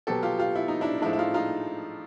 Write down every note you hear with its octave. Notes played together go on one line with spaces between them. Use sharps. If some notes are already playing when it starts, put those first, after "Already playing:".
B2 F#3 B3 G4 A4
F4 G4
F4 G4
E4
D#4
D4 E4
D#4
A2 F3 G#3 D4 E4
E4
D#4 F4
D#4 F4